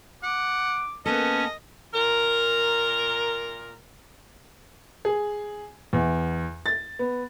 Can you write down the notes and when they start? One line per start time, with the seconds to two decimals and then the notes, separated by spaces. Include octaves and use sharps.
0.23 F#5 D6
1.06 A#3 B3 C#4 A4 B4 D#5
1.94 A#2 A#4
5.05 G#4
5.93 E2
6.66 A6
6.99 B3